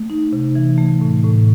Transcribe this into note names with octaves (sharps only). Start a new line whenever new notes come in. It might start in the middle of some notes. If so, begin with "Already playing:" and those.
Already playing: A3
D#4
C3
E3
A3
A2
A2